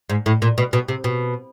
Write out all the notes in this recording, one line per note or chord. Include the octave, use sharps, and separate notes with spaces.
G#2
A2
A#2
B2
B2
C3
B2